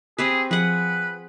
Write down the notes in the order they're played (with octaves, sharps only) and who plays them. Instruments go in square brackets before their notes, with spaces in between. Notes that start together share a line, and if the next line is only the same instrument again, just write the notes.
[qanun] C4 G4 B4 [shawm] G#4
[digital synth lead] F3 [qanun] G#4 F#5 [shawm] B4